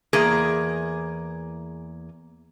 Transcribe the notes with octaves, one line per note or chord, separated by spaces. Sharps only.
E2 A#3 G#4